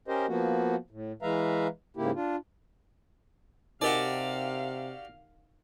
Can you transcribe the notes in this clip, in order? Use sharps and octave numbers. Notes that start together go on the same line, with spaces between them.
C#4 G4 A#4 C5 D#5
F3 A#3 B3 F#4
A2
E3 G#3 B4 E5 F5 A#5
G#2 C#3 A#3 E4 G4
D4 F4
C3 D#4 F#4 G4 A#4 D5 D#5 F5